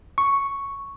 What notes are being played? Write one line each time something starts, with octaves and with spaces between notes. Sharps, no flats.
C#6